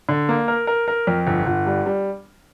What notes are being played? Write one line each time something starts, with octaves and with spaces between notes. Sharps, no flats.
D3
A#3
A#4
A#4
A#4
F2
G1
G1
G3
G3